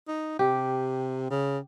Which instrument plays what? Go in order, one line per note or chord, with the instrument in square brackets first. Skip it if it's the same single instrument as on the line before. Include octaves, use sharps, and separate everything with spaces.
[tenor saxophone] D#4
[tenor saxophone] C3 [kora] G4
[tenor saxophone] C#3